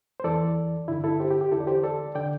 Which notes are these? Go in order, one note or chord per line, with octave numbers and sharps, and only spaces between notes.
C5
E2 E3 A4 D5
G2 D3 E4
E4 A4
G4 C5
G4
G4
E2 D3 E4 A4
D5
G4 C5
A4 D5
D3 D5 G5